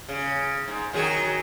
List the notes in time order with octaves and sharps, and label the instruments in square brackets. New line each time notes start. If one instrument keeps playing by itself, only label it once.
[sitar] C#3
G#2
D#3 F#3 G#4